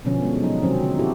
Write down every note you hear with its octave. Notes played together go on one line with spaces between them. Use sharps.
B2 D3 F3 B3 C#4
G#3
F#3 D#4
C3 D#3 F#3 C4 C#4
D3
E4 F#4 G4 A4